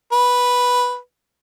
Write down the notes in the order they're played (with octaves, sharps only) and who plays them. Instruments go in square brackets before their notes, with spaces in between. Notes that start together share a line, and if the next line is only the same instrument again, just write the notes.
[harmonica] B4